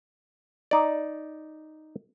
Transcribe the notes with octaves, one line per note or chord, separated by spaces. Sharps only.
D#4 D5